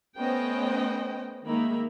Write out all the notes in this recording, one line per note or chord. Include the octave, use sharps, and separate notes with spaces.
A3 B3 C#4 C5 D#5 G5
D#3 G#3 A#3 D#4 E5 B5